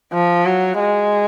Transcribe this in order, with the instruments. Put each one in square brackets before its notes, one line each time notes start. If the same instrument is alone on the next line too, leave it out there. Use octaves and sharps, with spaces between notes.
[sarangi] F3
F#3
G#3